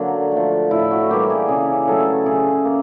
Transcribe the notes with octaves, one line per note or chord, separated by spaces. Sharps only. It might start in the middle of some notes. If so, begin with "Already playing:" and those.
Already playing: D3 F#3 A#3
F3 A3
A2 E4
F#4
E3 G3 A#3 G4
G#4
C#3 G#4
F#3 A3 A4
C#3 G#4
A#3